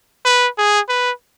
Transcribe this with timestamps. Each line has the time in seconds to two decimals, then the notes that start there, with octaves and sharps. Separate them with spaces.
0.25 B4
0.58 G#4
0.89 B4